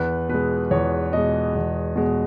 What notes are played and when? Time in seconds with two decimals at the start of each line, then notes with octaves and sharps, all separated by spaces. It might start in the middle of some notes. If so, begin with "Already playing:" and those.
Already playing: E2 B4
0.29 B2 G#3 B4
0.71 E2 C#5
1.13 B2 G#3 D#5
1.55 E2
1.96 B2 G#3